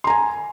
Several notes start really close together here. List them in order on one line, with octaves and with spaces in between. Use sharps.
C6 A#5 G#5